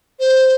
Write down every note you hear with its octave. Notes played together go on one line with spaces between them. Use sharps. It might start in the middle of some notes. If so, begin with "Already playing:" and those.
C5